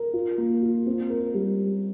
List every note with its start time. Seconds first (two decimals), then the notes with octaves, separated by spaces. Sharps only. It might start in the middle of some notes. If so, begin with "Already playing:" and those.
Already playing: A#4
0.13 F4
0.38 A#3
0.63 F4
0.86 C4
1.10 A#4
1.34 G3